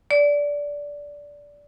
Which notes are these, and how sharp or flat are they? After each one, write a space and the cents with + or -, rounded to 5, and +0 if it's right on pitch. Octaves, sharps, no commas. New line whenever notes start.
D5 -15